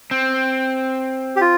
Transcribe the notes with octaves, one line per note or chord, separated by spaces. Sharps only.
C4
G4
F4